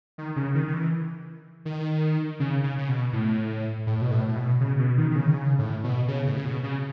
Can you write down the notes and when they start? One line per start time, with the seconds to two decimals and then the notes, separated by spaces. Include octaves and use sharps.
0.18 D#3
0.36 C#3
0.55 D#3
0.68 D#3
0.73 E3
1.65 D#3
2.40 C#3
2.63 C#3
2.78 C#3
2.88 B2
3.13 A2
3.87 A2
4.02 B2
4.11 A2
4.28 A2
4.36 B2
4.61 C#3
4.79 B2
4.98 D#3
5.11 D#3
5.16 C#3
5.26 D#3
5.34 C#3
5.59 A2
5.84 B2
6.08 C#3
6.26 A2
6.37 C#3
6.45 B2
6.63 C#3